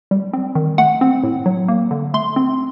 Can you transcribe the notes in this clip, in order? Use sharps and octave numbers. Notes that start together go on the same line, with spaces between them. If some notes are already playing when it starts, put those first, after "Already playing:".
G3
C4
D#3
A3 F#5
C4
A2
F#3
A#3
D3
A3 C6
C4